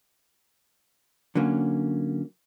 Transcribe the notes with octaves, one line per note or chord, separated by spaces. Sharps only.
D3 F#3 A#3 C#4